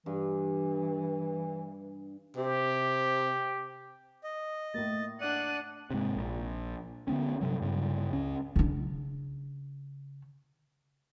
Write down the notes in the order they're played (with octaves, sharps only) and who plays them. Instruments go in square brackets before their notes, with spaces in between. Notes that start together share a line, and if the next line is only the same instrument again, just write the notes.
[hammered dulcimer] G2 [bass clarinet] E3
[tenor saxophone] C3 [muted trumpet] G4
[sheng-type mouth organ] D#5
[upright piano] A2 A#3 [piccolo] A6
[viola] D4 F#5 [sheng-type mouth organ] D5 [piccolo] D#7
[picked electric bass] G#2 C3
A#1
D3 F#3 B3 C#4
G2 C3 F#3
G2 C#3
C#2 C#4
[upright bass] C#3 D4